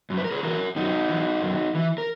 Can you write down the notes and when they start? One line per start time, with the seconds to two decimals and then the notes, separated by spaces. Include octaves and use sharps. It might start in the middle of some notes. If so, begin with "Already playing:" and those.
0.10 F#2
0.17 B4
0.24 A#4
0.31 G#4 B4
0.43 E3 F#4 A#4
0.76 F#2 D#4 F#4
1.09 E3
1.42 F#2
1.75 E3
1.98 A#4